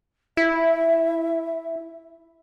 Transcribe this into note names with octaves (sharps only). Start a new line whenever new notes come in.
E4 E5